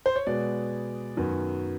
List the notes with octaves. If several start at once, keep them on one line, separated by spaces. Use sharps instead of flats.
C5
C#5
B2 G#3 B3 D5
F#2 D#3 F#3 B3